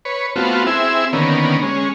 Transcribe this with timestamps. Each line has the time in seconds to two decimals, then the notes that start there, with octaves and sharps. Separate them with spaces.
0.05 B4 C#5
0.36 A3 B3 C4 F4 F#4
0.67 C4 E4 G#4 E5
1.13 D3 D#3 A#3 B3 C#4
1.63 G#3 C#4